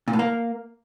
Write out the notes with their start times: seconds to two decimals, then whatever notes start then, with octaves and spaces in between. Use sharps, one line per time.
0.08 A#2
0.13 A2
0.19 A#3